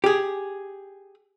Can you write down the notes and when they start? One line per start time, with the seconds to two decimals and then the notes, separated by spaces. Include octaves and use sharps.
0.04 G4 G#4